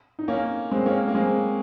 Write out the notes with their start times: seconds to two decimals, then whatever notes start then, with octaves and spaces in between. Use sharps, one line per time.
0.19 D#4
0.28 A#3 C#4
0.71 G#3 C4
0.86 A#3 C#4
1.08 A#3
1.14 G#3 C4